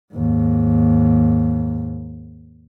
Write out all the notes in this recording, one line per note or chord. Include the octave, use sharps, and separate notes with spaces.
D#2 G#2